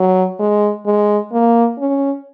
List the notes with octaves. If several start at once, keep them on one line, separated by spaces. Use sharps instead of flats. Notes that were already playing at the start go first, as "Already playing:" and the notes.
Already playing: F#3
G#3
G#3
A#3
C#4